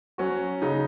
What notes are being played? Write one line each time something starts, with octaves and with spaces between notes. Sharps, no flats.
F#3 C#4 F#4
C#3 F#3 D#4